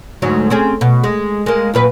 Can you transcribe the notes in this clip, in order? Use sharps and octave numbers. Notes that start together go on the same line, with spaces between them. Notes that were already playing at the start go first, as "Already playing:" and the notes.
D2 G#2 F#3
C4 C#4 G#4
B2
G#3
G#3 A#3
F#2 A#2 B4